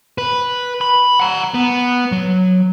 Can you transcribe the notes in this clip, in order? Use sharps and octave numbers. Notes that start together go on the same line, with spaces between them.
B4
B5
F#5 A#5
B3
F#3